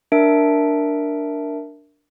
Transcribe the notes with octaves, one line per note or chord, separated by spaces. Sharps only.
D4 A#4 E5 D7